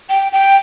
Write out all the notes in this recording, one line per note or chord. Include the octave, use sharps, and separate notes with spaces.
G5
G5